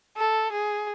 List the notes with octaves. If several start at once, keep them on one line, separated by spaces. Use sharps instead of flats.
A4
G#4